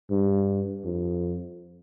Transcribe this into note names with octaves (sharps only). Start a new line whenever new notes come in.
G2
F2